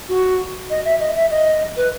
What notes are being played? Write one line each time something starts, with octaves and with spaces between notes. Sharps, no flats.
F#4
D#5
E5
D#5
E5
D#5
B4